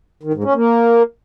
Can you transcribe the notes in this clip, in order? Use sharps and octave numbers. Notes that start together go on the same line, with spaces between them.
D#3
G#2
C#4
A#3